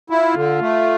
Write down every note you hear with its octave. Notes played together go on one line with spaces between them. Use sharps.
E4 F4
D3
A3